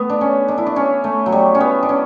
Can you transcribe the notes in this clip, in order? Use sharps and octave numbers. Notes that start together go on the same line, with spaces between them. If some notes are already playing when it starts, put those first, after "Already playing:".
Already playing: A3 B3
D4
C#4
D4
E4
D4
C#4
A3
F#3
G3
C#4
B3
D4
C#4